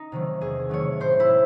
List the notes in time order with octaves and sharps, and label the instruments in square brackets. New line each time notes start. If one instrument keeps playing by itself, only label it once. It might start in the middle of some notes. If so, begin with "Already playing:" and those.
Already playing: [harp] D#4
C3 D#3 F#3 A3
E2 G#4
C3 D#3 F#3 A3 C#5
A2 C5
E4
G#3